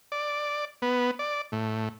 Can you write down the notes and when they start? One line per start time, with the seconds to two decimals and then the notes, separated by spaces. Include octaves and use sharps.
0.12 D5
0.82 B3
1.19 D5
1.52 A2